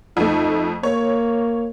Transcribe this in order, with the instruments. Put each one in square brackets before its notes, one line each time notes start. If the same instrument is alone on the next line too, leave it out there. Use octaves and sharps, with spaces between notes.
[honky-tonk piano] F2 A3 [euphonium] D#4
[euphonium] A#3 [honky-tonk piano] C#5